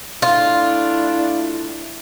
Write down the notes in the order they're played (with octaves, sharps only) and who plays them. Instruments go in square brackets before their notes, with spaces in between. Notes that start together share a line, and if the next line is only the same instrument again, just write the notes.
[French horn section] A3 D4 E4 [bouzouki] F4